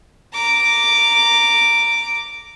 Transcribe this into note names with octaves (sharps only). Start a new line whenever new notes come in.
A#5 D6